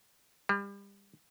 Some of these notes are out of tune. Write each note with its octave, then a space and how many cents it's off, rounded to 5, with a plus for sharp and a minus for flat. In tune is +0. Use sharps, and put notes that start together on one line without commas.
G3 +30